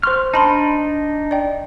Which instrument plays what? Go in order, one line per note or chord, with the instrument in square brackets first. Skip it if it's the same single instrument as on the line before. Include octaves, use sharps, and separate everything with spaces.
[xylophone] C5 C6 C#6 [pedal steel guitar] F6
[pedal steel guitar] D4 D#4 [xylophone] A5 B5 C6
[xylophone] D5 G5